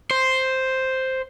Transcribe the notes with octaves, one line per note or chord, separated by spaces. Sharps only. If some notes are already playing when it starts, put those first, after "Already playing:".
C5